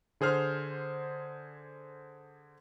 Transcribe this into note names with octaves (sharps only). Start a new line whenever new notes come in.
D3 G#4 C5 F6